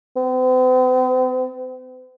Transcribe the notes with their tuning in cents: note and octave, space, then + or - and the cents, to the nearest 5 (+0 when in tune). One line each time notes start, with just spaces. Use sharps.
C4 -45